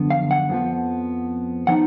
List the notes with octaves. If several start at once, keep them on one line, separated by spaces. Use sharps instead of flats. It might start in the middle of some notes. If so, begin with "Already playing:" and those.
Already playing: F#2 D3 F3 B3
F5
F#5
F2 F3 B3
F3 B3 D#4 F#5